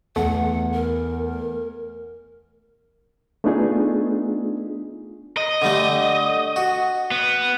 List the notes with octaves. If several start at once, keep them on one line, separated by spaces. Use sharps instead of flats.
E2 A3 F#5
A#4
A3 B3 D4 D#4 F4 G#4
D#5
D3 G3 A3
F#4
B3